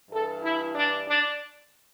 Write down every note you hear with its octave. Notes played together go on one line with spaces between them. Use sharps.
G2 E3 A4
E4
D4
D4